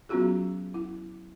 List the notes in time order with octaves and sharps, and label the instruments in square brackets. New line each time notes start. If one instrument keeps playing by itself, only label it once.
[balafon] F#3 B3 C#4 F4 F#4 G#4
E4